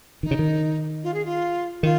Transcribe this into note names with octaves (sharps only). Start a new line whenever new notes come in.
D#3 D#4
C#3
D#3
F4
G#4
F4
D#3 F4